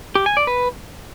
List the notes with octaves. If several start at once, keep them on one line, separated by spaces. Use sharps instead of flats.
G4
G#5
D5
B4